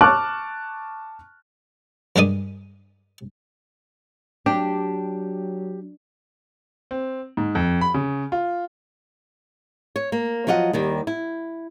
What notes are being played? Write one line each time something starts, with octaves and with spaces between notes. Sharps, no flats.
A5 C#6 D6 F6 F#6
G2 G3 G#3 A#4 D5 D#6
F#3 D4 G4
C4
G#2
F2
B5
C#3
F4
C#5
A#3
F3 F#3 F4 D#5 F#5
D#2 D#3 G3
E4